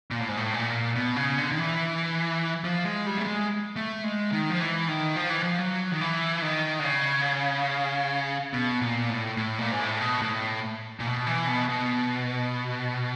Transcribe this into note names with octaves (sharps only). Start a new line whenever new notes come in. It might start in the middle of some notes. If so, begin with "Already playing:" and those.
A#2
A2
G#2
A2
A#2
B2
C#3
D3
D#3
E3
F3
G#3
G3
A3
G#3
A3
G#3
D#3
F3
E3
D#3
F3
E3
F3
F#3
D#3
E3
D#3
D3
C#3
B2
A#2
A2
A2
A#2
G#2
A2
B2
A2
A#2
B2
E3
B2
B2